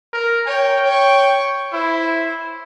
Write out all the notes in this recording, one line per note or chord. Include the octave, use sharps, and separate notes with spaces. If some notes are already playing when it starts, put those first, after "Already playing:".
A#4
C#5 G5
C#5 C#6
E4 C5